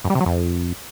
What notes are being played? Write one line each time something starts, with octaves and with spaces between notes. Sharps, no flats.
F#2
G3
C3
F#3
F2